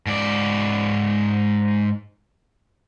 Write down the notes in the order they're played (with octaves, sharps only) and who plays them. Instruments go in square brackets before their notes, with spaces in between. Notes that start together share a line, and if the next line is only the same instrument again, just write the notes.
[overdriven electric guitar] G#2 D5